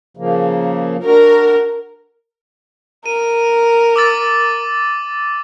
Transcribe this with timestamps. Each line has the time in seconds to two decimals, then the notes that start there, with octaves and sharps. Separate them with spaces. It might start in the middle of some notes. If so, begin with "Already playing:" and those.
0.17 C#3 F3 A#3
1.04 D4 F#4 A#4
3.06 A#4 D#7
3.96 D6 E6 A6